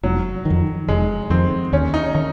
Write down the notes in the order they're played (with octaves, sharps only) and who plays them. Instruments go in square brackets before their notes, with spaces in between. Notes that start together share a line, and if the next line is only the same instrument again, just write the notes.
[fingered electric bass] F1 [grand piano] F#3
[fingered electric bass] F2 D#3
[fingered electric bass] F1 [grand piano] G#3
[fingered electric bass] F2 D#3 [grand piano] C4
[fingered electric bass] D#2 [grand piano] C#4
[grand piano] D#4
[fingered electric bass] D#3 [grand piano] D#4